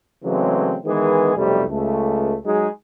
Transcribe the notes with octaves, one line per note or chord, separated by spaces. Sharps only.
C#3 E3 F#3 G#3 A3 C4
D#3 E3 G#3 B3 G#4
B1 F2 C3 G3 A3
C#2 A3
F#3 G#3 D#4 G#4